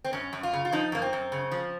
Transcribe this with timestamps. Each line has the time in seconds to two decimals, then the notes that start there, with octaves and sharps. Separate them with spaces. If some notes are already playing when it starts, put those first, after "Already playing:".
0.04 C4
0.13 F#2 C#4
0.33 F#2
0.43 F4
0.53 C#3
0.65 F4
0.72 F3 D#4
0.92 F#2 A#3
1.02 C4
1.13 F#2
1.32 C#3
1.51 F3